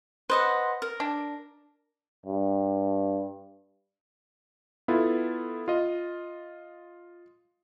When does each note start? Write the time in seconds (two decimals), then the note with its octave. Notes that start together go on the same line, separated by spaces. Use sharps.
0.30 B4 C5 D#5 F#5
0.82 A#4
1.00 D4
2.26 G2
4.88 B3 E4 F4 A4
5.68 F4 D#5